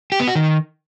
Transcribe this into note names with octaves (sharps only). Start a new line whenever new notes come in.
G4
B3
F#4
D#3